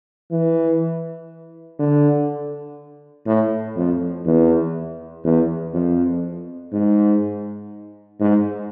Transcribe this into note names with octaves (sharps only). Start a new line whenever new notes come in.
E3
D3
A2
F2
E2
E2
F2
G#2
G#2